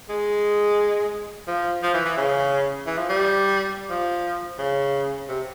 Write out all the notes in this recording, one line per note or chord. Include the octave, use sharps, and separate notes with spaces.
G#3
F3
F3
E3
E3
C#3
E3
F3
G3
F3
C#3
C3